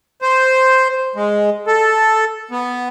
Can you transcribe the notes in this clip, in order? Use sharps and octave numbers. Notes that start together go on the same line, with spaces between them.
C5
G#3
A4
B3